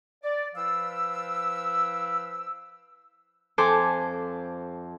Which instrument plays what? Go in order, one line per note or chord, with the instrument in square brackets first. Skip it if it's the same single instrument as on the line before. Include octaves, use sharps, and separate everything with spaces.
[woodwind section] D5
F3 E4 B4 F5 G5 E6
[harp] F2 A4 C5 G#5 D6